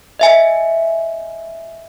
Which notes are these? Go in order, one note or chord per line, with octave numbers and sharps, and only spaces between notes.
D#5 E5 G#5